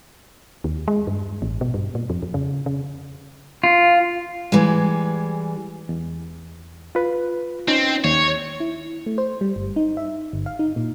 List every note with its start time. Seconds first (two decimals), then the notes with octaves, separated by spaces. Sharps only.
0.64 D#2
0.88 G#3
1.07 G2
1.42 A1
1.61 B2
1.74 G2
1.95 A#2
2.10 F2
2.22 F2
2.34 C#3
2.66 C#3
3.64 F4
4.52 E3 G3 G#3
5.89 E2
6.95 F4 B4
7.68 C4 C#4 D#4
8.04 D#2 C#5
8.60 E4
9.06 A3
9.18 C5
9.41 G3
9.56 G1
9.76 D#4
9.97 E5
10.33 G1
10.46 F5
10.59 D#4
10.76 A#2